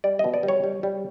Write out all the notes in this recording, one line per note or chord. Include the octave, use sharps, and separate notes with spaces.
G3 D5
B2 D#5
D5
G3
C#5
G3
G3